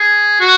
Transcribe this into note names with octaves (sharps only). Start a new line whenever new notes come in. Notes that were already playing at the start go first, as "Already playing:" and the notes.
Already playing: G#4
F#4